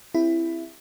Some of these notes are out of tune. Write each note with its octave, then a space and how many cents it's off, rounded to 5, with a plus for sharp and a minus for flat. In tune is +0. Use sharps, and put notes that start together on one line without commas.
C4 +0 E4 +10 G4 +40